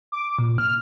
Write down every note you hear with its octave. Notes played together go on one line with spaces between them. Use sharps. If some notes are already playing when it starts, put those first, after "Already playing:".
D6
A#2
F6